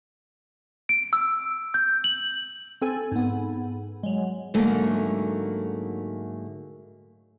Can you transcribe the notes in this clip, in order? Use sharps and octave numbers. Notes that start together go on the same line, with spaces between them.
D7
E6
G6
F#7
C4 A4 G#5
G#2 B3
F#3 G#3
G#2 D3 F#3 A3 A#3